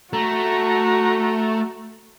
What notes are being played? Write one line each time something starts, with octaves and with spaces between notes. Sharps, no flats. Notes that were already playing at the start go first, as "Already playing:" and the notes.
A3 F#4 A#5